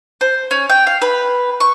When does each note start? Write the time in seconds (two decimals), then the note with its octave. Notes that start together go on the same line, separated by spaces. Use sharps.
0.21 C5
0.51 C#4
0.70 G5
0.87 F5
1.02 B4
1.60 C#6